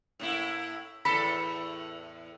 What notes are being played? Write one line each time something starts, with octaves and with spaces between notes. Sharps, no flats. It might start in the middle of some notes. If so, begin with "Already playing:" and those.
A2 A#3 E4
E2 A2 A4 B5